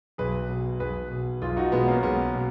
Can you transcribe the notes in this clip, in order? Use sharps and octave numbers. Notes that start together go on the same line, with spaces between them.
B1 G#4 B4
B2
B1 G#4 B4
B2
B1 F4 G#4
D#4 F#4
B2 G#3 B3
A#3 C#4
B1 G#3 B3
B2